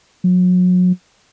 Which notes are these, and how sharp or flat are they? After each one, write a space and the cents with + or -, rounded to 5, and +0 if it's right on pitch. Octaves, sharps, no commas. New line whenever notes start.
F#3 -35